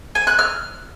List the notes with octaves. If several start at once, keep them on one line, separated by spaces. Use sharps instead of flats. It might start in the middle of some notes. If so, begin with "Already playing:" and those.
G#5
F#6
F6